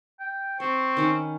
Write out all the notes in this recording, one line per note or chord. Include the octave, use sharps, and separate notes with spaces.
G5
C4 C5 C#6
D#3 C#4 B5